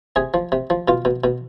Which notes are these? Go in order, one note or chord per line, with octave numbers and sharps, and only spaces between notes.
C3 G#4
F3
C3
F3
B2 F4
B2
B2